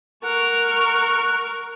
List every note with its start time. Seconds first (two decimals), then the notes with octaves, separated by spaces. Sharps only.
0.24 A#4 F#5 C#6